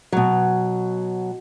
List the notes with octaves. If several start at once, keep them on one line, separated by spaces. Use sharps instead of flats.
B2 F#3